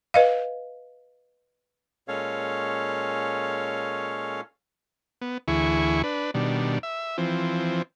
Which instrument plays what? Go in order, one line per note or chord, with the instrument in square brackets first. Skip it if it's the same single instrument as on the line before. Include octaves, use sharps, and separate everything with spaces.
[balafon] B4 D#5 F5
[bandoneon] A#2 G#3 C#4 A4 C#5 F5
[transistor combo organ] B3
D2 E3 E4 G#4 C#6
D4 B4
B2 D#3 G3 D4
E5
E3 F3 C4